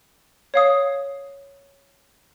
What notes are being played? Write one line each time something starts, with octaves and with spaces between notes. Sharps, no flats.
C#5 F5 D#6